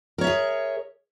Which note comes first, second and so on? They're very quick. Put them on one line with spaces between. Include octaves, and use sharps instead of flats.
A#4 C#5 E5 G#4